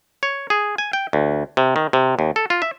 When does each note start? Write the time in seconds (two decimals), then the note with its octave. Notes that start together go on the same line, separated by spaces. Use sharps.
0.23 C#5
0.50 G#4
0.78 G#5
0.93 G5
1.13 D2
1.57 C3
1.76 D#3
1.93 C3
2.19 D#2
2.36 A4
2.50 F4
2.62 E5